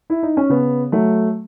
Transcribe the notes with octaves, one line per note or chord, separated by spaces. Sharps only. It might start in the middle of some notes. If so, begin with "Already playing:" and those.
E4
D#4
C#4
C#3 B3
F#3 A3